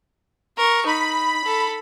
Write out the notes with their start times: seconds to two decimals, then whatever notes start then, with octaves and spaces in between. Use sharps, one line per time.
0.58 A#4 C#6
0.86 D#4 B5
1.44 A4